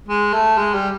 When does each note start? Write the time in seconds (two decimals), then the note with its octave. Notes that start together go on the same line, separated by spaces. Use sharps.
0.09 G#3
0.33 A3
0.58 G#3
0.74 G3